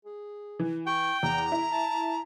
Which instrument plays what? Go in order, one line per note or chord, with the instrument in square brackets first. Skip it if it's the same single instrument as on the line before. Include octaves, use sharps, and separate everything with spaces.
[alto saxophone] G#4
[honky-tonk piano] E3
[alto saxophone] G5 [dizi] C#6
[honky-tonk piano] E2 [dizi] A#5
[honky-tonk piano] E4
[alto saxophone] A5